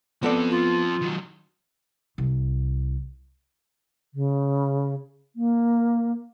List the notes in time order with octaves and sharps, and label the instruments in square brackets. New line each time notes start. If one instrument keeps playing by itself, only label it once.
[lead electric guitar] F3 C4 [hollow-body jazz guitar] B3 A4 D5
[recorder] F4
[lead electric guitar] D#3 F#3
[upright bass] C2
[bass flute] C#3
A#3